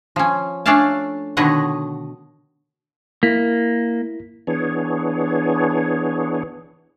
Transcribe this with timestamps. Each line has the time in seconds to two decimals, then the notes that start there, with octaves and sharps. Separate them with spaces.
0.16 F3 C#4
0.66 A3 C#4 D4 D5 F5 A5
1.37 B2 D3 D#3 C#5 D#5 F#5
3.23 A#3 E4 B6
4.47 E3 B3 D4 G#4 C#5